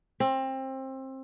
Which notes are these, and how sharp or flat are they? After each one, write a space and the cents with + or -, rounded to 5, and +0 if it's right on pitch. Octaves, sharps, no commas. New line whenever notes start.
C4 +25